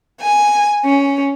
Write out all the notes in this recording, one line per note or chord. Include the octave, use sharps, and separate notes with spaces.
G#5
C#4